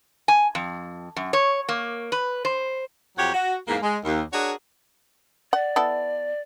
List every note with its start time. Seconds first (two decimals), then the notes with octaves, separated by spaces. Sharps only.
0.28 G#5
0.55 F2
1.16 F#2
1.33 C#5
1.69 A#3
2.12 B4
2.45 C5
3.18 F2 F#3 G4 C#5 F#5
3.34 F#4
3.68 E2 G#2 A#3
3.83 G#3
4.05 D#2
4.33 D4 F#4 G#4 A#4 C#5
5.53 D5 F#5
5.76 B3 E4 A4